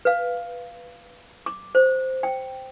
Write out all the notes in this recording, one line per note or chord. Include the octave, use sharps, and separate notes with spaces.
B4 F5
D6
C5
G5